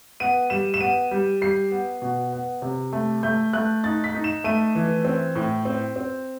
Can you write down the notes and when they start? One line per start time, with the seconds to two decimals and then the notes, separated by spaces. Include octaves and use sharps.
0.20 B3 D#7
0.50 G3 E7
0.74 E7
0.81 B3 D#7
1.11 G3
1.41 G3 C7
1.71 B3
2.02 B2
2.32 B3
2.62 C3
2.93 A3
3.23 A3 G6
3.53 A3 F#6
3.84 D#4 A6
4.04 B6
4.14 D#4
4.24 E7
4.44 A3 D#7
4.75 E3
5.05 C4
5.35 A2
5.65 C4
5.96 C4